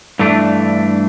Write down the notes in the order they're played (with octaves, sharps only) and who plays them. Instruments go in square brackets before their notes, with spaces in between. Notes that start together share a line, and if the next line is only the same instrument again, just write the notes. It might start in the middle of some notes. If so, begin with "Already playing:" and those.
[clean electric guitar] G2 E3 A3 D4